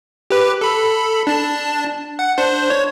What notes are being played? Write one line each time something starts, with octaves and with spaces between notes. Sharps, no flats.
G4 B4
A4 B5
D4 A5
F#5
D4 C5
C#5